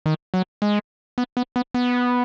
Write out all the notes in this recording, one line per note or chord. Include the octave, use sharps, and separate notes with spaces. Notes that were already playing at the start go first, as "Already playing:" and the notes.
D#3
F#3
G#3
B3
B3
B3
B3